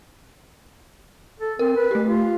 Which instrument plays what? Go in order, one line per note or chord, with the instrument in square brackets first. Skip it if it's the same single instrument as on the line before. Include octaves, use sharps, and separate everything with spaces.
[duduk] A4
[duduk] C4 [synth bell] A#4
[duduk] B4
[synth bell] A3 G4
[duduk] F4